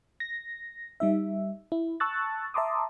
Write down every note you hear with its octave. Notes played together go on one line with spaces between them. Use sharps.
A#6
G3 D#4 E5
E4
A5 C#6 E6 F#6 A6
E5 A5 A#5 C6 D6 D#6